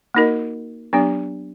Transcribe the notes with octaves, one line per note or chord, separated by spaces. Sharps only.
A#3 D#4 F#4 A#4 D#5
F#3 B3 D4 G4